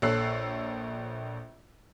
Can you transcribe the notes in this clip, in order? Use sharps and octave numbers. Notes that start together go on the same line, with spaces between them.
A#1 A4 C#5 E6 F#6 C7